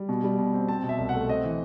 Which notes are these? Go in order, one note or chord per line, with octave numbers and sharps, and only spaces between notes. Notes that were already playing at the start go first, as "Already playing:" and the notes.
Already playing: G3
B2
G3
B2
C4
C4 A5
B2
E5
C2
A3 F#5
C4 D#5
E3